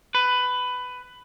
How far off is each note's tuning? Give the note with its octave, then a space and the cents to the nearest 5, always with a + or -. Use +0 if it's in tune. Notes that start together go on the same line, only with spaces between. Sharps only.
B4 +15